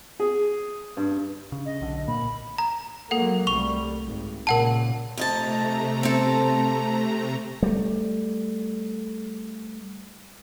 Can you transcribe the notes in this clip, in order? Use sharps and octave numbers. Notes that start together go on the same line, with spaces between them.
G#4
G2
C#3
D#5
B1 D3
G#1 A#2 A#3 B5
A#5
F#3 G#3 A#3 A4 F#5
C2 G3 A3 C#6 F7
G#1
A#2 C#3 A#4 F#5 A5
F2 C3 A3 D#5 A5 A#5
C4 A4
G3 A3